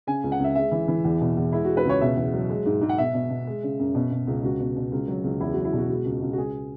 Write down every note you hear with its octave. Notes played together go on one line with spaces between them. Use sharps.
C#3 G#5
C#2
F#5
C#2 E5
G#3 E5
E3
E3
E2
B2
E2
G#3 E4
G#3 F#4
B4
C#2 C#5
B2 E5
E2
F#3
G#3
G#2
G#2
F#5
B2 E5
B2
B2
G#3
C#3
F#2
B2
B2
C#2
C#2 F#4
B2
B2
C#2
F#3
C#2
E2 E4
F#3 F#4
E4
B2 F#4
G#3 F#4
C#2
C#2
F#4
C#2 G#4